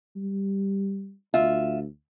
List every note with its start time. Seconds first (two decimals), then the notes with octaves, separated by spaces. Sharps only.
0.16 G3
1.34 D2 F4 E5